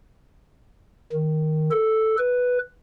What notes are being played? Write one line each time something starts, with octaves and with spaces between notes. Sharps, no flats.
D#3
A4
B4